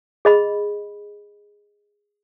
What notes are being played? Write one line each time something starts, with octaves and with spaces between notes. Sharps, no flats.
G#4 D#5 B5